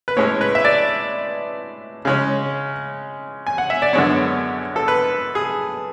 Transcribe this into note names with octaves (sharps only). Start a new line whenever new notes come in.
B4
A2 G#3 C#4 C#5
B4
E5
D5
C#3 G#3 C#4
G#5
F#5
E5
D5
F#2 D3 G#3 B3 C#5
A4
B4
G#4